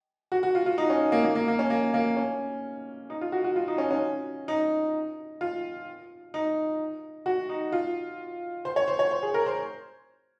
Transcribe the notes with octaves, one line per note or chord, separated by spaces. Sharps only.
F#4
F#4
F4
F4
D#4
C#4
A#3
A#3
A#3
A#3
C#4
A#3
A#3
C#4
D#4
F4
F#4
F#4
F4
D#4
C#4
C#4
D#4
F4
D#4
F#4
D#4
F4
C5
C#5
C5
C#5
C5
G#4
A#4
C5